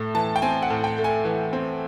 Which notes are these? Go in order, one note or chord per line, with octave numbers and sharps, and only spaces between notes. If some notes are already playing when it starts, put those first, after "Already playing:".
Already playing: A2 A3
E3 A5
G5
C4 G#5
F#5
A2
G5
A3
G#5
E3
C4